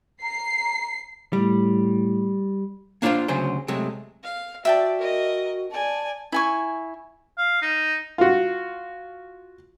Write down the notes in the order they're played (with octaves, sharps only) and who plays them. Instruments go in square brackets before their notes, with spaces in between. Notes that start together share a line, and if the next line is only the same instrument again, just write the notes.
[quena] A#5 [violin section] C7
[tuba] A2 [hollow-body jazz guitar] G3
[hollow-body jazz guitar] A#3 D4 F4 A4 C5 F5
D2 C#3 F#3 G#4 C5
C3 F#3 G#3 A3
[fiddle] F5
[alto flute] F#4 [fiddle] D5 [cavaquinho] E5 G5 A5
[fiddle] A#4 D#5
[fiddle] D5 G#5 [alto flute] A5
[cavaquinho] E4 G#5 C#6
[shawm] F5
D#4
[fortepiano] F4 F#4